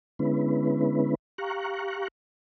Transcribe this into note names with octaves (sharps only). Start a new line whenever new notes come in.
D3 G#3 B3 C#4 E4 B4
G4 F5 A#5 C#6 F#6